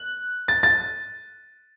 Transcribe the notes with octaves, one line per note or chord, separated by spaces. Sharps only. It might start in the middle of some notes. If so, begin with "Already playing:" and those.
Already playing: F#6
A6
A6